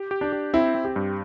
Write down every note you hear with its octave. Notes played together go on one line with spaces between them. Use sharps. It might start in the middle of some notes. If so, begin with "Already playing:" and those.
Already playing: G4
G4
D4
G4
C4 E4
C4
G4
G2